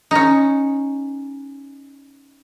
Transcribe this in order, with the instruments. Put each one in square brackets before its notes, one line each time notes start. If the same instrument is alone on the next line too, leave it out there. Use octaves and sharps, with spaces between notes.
[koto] C#4 D#4